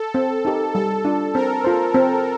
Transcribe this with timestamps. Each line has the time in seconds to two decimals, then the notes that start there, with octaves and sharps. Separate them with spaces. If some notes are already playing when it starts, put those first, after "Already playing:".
Already playing: A4
0.15 C4
0.45 D#4 G4 A#4
0.75 G3 A4
1.05 D4 F4
1.35 C4 A#4
1.64 F4 C5
1.94 C4